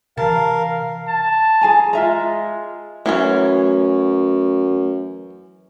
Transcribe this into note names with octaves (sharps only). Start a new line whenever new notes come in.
C3 E3 A#4 F5 A5
A5
G#4 G#5 A#5
G#3 F4 E5 A#5
F#2 E3 F#3 A3 C#4